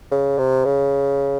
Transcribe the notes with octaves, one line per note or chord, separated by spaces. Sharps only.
C#3
C3
C#3